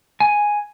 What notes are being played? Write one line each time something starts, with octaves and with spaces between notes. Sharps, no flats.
G#5